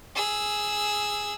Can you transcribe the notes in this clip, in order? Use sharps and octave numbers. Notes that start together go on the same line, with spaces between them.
G#4 E6